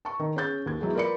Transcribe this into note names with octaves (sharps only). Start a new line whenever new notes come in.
A5 C#6
D#3
C#4 G#4 G6 A6
D#2 G#6
E3 F#3 G#3 B3 G#4
F4 A#4 B4 D5 B5 C#7